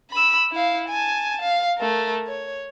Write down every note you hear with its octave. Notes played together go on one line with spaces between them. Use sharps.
B5 E6
E4 F5
G#5 A5
F5
A3 A#4
C#5